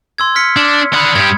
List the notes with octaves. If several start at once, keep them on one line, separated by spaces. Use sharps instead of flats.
C6 E6 G#6
F6 B6 C#7
D4
D4 F#5 B5 D#6 C#7
G2 G4 G#6